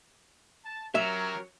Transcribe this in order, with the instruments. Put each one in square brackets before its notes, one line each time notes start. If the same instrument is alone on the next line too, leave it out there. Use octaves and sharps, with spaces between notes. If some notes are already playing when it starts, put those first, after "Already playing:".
[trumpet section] A5
[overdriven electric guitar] F#3 [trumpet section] C#4 G4 A#4 [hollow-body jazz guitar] E5